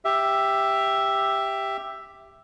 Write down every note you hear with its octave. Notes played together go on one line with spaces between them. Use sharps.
G4 E5